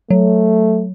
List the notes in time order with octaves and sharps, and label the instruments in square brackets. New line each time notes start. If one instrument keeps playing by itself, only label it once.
[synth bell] F#3 [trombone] A3